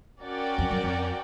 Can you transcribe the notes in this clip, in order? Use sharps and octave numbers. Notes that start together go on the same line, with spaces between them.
C#4 F#4 A#4 D5 G5
F2
F#2
F2